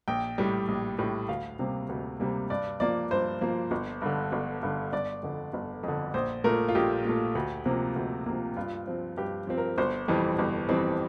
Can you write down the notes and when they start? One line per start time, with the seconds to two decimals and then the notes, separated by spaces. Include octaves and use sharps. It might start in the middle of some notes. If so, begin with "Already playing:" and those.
0.08 A#1 G5
0.38 A2 G3
0.68 A#1
0.99 A2 G3
1.29 D2 F5
1.59 C3 G3 A#3
1.89 D2
2.20 C3 G3 A#3
2.50 G2 D5
2.80 F3 A#3 D5
3.11 G2 C5
3.41 F3 A#3
3.71 G1
4.02 G2 D3
4.32 G1
4.63 G2 D3
4.93 G1 D5
5.23 F2 D3
5.53 G1
5.83 F2
5.88 D3
6.14 A#1 C5
6.44 A#2 A3 A#4
6.69 F4
6.75 A#1 G4
7.05 A#2 A3
7.35 D2
7.65 C3 F3 A#3
7.96 D2
8.26 C3 F3 A#3
8.57 G2 F4
8.87 F3 C4
9.17 G2 G4
9.47 F3 C4
9.58 A#4
9.78 G1 C5
10.08 F2 E3 G3 C4
10.39 G1
10.69 F2 E3 G3 C4